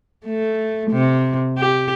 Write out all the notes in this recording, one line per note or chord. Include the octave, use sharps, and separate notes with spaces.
A3
C3
G4